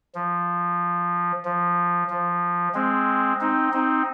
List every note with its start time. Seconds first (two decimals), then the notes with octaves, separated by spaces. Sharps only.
0.15 F3
1.45 F3
2.10 F3
2.75 G#3 C4
3.41 C4 D#4
3.73 C4 D#4